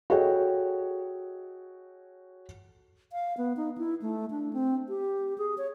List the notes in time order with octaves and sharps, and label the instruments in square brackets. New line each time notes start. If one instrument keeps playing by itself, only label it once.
[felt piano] F#4 G#4 A4 C#5 D#5 G5
[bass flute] F5
B3
D#4
E4
A3
D4
C4
G4
G#4
C#5